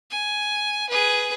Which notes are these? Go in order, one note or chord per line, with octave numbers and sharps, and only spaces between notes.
G#5
G#4 B4